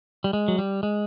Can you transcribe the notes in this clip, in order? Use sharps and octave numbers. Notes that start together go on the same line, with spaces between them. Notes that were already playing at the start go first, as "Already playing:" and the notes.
G3
G#3
F#3
G3
G#3